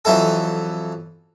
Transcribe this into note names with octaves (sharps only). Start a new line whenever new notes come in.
F2 E3 F#3 E4 A4